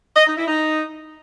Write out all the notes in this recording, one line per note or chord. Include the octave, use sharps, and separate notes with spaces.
D#5
D#4
E4
D#4